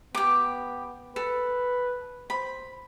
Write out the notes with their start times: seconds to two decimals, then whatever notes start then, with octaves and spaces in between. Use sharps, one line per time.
0.15 B3 G4 D6
1.16 A4 B4
2.30 C5 B5